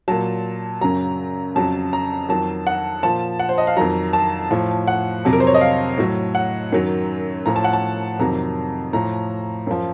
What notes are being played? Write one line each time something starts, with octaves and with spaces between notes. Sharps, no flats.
A#2 F#3 A5
F#2 C#3 F#3 A#5
F2 C#3 F#3 A5
A#5
F2 D#3 F#3 A5
F#5
A#2 F3 A5
F#5
C5
D#5
F5
F2 D#3 F#3 A#5
A5
A2 F3
F#5
F2 C3 F#3
A#4
C5
C#5
D#5
F5
A2 F#3
F#5
F#2 D#3 F#3
A2 F3 A#5
A5
F#5
A5
F2 C3 D#3 F#3 A#5
A2 F3 A#5
F#2 F3